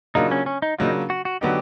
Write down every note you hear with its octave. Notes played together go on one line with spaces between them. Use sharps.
C#3 F#3 A#3 D4 D#4 F4
C#4
C#4
D#4
C#3 F#3 A#3 D4 D#4 F4
F#4
F#4
D3 F#3 B3 D#4 G4